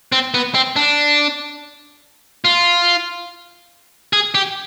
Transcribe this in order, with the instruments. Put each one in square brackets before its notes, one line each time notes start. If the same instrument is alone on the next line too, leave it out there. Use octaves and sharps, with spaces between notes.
[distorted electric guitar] C4
B3
C4
D4
F4
G#4
G4